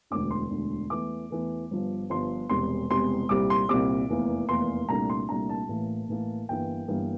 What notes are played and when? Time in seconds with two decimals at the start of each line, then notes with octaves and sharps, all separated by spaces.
0.11 E1 D2 D3 D6
0.31 C6
0.50 E1 D2 D3
0.90 E2 E3 A3 D6
1.30 E2 E3 A3
1.71 G1 G2 F3
2.10 G1 G2 F3 C6
2.49 E1 E2 C3 G3 C6
2.90 E1 E2 C3 G3 C6
3.29 C2 A#2 G3 C4 D6
3.50 C6
3.69 C2 A#2 G3 C4 D6
4.10 F1 E2 E3 A#3
4.49 F1 E2 E3 A#3 C6
4.89 C2 A#2 A3 D4 A#5
5.10 C6
5.29 C2 A#2 A3 D4 A#5
5.49 A5
5.69 A1 A2 E3 A#3
6.08 A1 A2 E3 A#3
6.49 G1 G2 E3 A#3 G5
6.88 G1 G2 E3 A#3